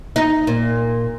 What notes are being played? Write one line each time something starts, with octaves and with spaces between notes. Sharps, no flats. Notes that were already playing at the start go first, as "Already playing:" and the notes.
D#4
A#2